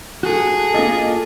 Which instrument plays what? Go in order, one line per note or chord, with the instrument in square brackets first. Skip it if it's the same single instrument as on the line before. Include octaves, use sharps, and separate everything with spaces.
[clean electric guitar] F#4 A4 [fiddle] G#4
[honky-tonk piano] A#3 D#5 [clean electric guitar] F4 A4